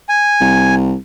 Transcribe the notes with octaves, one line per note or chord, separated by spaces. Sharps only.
G#5
C2